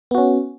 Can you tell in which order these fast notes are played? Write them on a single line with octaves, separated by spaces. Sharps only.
B3 F#4 C#4